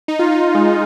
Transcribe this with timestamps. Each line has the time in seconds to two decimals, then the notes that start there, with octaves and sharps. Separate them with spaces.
0.08 D#4
0.19 F4
0.31 D#4
0.55 G#3